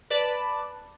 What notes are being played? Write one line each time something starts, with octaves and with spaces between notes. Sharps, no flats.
B4 D5 A5 B5